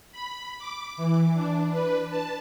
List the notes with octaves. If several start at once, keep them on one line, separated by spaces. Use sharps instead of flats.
B5
D6
E3
D4
B4
A5